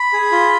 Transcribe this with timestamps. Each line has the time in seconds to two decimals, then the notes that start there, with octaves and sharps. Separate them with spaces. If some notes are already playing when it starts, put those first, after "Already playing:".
Already playing: B5
0.13 G#4
0.32 F4